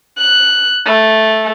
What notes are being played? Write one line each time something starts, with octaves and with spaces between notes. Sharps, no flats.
F#6
A3